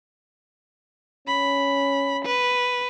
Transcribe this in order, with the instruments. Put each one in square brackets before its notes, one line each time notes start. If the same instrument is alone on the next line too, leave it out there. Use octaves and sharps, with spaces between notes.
[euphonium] C#4 [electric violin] B5
[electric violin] B4